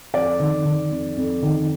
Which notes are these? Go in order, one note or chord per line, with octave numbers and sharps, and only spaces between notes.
F2 D5
D#3
D#3
F2
F2
D#3